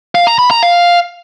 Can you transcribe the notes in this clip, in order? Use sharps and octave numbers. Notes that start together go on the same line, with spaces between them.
F5
A#5
B5
A#5
F5